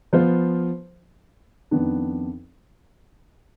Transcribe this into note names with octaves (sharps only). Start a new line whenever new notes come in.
F3 B3 F4 C5
F2 D#3 B3 D4